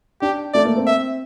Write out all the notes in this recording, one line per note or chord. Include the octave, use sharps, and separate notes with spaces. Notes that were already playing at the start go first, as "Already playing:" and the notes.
D4 G4
A3 D5
A#3
C4
E5